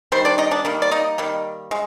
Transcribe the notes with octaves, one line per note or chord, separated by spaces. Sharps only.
D#3 G3 C5
D4 D5
D#4 D#5
D4 D5
D#3 G3 A#3
D5
D#4 D#5
D#3 G3 A#3
G#3